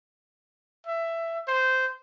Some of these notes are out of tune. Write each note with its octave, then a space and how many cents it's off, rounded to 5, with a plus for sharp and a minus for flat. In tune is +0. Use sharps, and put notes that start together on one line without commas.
E5 +15
C5 -10